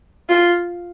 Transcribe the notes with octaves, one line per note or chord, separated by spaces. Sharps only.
F4